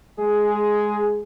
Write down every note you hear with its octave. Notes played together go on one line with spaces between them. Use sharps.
G#3 G#4